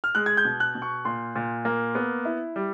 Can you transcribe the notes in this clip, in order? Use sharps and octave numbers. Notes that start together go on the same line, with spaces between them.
F6
G#3 F#6
G#6
G6
B2
F#6
B2
C#6
A#2 C6
A#2
A#3
B3
E4
G3